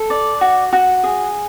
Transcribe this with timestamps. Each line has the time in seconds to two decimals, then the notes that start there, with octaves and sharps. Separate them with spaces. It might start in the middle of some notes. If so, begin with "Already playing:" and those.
Already playing: A4
0.10 D5
0.41 F#4
0.73 F#4
1.04 G#4